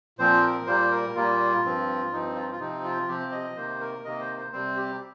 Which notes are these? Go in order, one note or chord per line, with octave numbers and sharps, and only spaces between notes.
A#2 F3 C4 C5
A#4
A#2 G3 A#3 C5
A#4
A#2 G3 A#3 F4
G2 F3 C4
G2 F3 C4 D#4
F4
F4
C3 F3 C4 D#4
F4
C3 F3 C4 G4
D#5
C3 D#3 A#3 C5
A#4
C3 D#3 A#3 D#5
C5
C5
C3 G3 C4 C5
G4